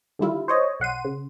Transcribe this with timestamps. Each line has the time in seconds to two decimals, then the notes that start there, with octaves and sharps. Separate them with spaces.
0.19 D3 D#3 G3 E4 F4
0.48 C5 C#5 D#5
0.80 B1 F#5 C6 D#7
1.05 C#3